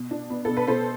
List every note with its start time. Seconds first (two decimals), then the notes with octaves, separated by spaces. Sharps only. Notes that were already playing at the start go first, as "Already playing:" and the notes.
Already playing: B2
0.11 D4
0.30 B3
0.45 B2 A4
0.57 B4
0.67 B2 A4 C5